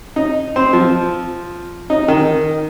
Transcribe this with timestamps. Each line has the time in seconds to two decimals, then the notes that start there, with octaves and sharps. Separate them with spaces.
0.16 D#4
0.56 C4
0.73 F3
1.90 D#4
2.08 D#3